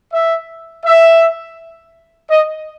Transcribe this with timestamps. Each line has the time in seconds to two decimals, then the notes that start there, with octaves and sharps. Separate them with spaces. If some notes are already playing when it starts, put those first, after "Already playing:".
0.13 E5
0.85 E5
2.30 D#5